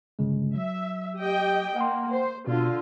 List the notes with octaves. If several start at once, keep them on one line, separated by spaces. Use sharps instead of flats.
G1 C#3 G#3
F#3 E5
G4 D#5 G5
A#3 F#5 G5 C6
C5
B2 D3 F4